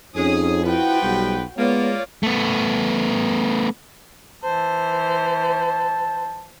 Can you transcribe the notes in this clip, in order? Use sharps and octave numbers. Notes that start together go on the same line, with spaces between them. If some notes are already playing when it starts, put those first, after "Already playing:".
F2 C#4 D#4 G#4 D#6
F3 E4 F#4 B4 G5
B1 G3
G#3 A#3 B3 F4 C#5 D5
A3 B3
E3 C5 A5